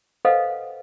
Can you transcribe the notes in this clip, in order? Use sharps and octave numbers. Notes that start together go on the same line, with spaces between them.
A4 B4 C5 D#5 F5 F#5